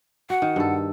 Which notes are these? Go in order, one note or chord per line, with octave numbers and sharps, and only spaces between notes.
F#4 F#5
D#3
G2 A4